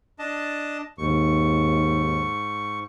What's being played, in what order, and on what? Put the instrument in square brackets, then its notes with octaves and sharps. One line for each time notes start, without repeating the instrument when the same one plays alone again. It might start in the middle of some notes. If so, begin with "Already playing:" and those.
[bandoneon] D4 D#5 A5
[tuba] D#2 [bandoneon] G#2 C#6